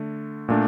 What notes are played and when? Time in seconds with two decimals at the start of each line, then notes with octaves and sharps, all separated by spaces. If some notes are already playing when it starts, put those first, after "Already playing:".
Already playing: D3 A3
0.49 A#2 A3 D4